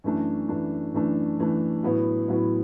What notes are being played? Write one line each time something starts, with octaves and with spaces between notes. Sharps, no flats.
F#2 E3 A3 D4
F#2 E3 A3 D4
F#2 E3 A3 D4
F#2 E3 A3 D4
A2 F#3 B3 E4
A2 F#3 B3 E4